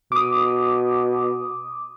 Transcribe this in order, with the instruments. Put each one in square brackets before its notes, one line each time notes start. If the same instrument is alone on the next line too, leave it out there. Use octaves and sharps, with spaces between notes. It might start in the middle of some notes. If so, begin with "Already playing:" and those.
[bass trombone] B2 [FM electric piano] D6 D#6